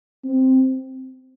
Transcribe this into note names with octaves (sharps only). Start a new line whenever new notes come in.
C4